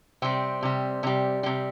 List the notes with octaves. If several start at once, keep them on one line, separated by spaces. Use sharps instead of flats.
C3 G3 C4
C3 G3
C3 G3
C3 G3